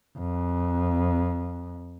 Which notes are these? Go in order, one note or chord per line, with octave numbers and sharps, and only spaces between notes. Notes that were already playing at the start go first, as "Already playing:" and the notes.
F2